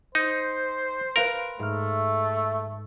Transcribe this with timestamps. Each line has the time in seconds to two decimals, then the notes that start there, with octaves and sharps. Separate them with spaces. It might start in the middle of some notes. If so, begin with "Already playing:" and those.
0.15 D#4 C5
1.16 A#4 B4 F5 C6
1.59 G#2 A3 F6